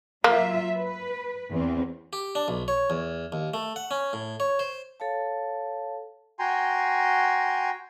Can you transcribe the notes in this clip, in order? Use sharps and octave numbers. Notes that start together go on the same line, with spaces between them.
F#3 A#3 F4 E5
B4
E2 C4
G4
D4
B1
C#5
E2
D#2
A3
F#5
C#4
A2
C#5
C5
A4 C#5 F5 A5
F#4 G5 G#5 A#5 C6